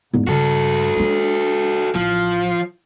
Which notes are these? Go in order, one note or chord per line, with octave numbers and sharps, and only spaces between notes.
E2 G#2
G2 C#3 F#4 A4
G#3 D4
A1 F3